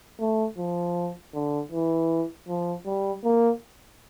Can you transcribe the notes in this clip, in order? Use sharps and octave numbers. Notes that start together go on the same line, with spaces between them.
A3
F3
D3
E3
F3
G3
A#3